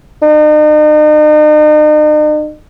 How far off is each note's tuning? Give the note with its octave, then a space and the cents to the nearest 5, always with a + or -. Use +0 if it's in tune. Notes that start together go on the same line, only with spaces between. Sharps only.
D#4 -40